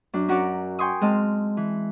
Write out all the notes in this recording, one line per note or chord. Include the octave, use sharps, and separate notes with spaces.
F#2 D4
C#4 F#4 A#4 C#5 D5
G5 G#5 C6 C#6 D#6
G#3 C4 D#5 A5 F6
E3